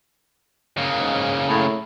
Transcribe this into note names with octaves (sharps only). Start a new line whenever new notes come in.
C#3 A#3
G#2
A2